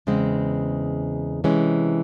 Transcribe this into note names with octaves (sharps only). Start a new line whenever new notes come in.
E2 C#3 G#3 C4
C3 E3 G#3 C#4